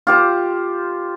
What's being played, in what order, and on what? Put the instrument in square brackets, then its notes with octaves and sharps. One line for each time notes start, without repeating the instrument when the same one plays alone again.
[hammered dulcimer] F4 G4 C5